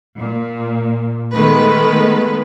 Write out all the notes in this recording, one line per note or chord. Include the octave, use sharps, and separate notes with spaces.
A#2
D#3 G#3 A3 B3 B4